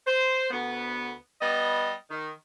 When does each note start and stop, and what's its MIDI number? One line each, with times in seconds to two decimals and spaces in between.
0.06 0.48 72
0.51 1.12 38
0.51 1.12 59
1.41 1.92 55
1.41 1.92 59
1.41 1.92 75
2.10 2.30 51